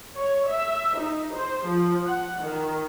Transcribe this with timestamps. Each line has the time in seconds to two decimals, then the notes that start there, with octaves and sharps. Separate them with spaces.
0.16 C#5
0.48 E5
0.98 D#4
1.34 C5
1.66 F3
2.06 F#5
2.40 D#3